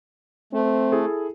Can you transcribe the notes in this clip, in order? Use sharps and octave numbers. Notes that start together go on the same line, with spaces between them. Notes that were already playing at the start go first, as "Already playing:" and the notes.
A3 C4
E4 G#4 A4